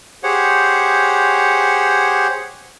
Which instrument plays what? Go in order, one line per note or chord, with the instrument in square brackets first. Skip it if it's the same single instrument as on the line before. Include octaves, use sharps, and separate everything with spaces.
[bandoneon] G4 G#4 C5 C#5 F#5